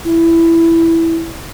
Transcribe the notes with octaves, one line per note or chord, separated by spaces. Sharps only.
E4